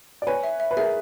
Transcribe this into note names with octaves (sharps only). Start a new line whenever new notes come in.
D5
B4 C#5 G#5
E5
E5
B4
G#4 A#4 E5